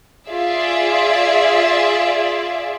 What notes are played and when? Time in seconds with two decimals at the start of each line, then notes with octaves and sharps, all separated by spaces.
0.28 F4 G#4 D5 E5